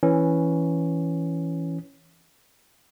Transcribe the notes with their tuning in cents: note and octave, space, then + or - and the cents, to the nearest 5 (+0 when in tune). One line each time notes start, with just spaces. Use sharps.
E3 +0 C#4 +0